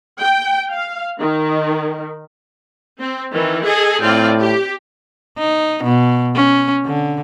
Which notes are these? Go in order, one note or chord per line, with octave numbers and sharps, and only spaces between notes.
G5
F5
D#3
C4
D#3 E3
G#4 A4 D#5
A2 C4 F4 D5
G4
D#4
B2
C#4
D3